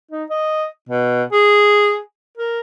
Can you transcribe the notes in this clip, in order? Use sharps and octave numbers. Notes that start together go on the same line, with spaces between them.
D#4
D#5
B2
G#4
A#4